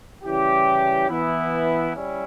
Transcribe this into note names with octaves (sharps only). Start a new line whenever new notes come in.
C#3 E3 G3 C#4 E4 G4
E3 B3 E4
G3 C#4 E4